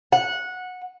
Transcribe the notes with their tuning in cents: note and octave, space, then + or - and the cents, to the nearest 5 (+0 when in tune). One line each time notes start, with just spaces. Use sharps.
F#5 -15